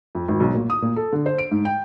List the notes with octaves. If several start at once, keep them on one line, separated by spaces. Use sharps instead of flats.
F2
G#1
B1
A#2
D#6
A#2
A4
D3
C5
D7
G#2
G5